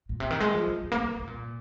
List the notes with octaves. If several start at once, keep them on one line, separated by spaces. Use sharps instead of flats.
A#2
C3
D#3
G#3
F3
C3
F3
A#3
G#3
A#2
C3
A#2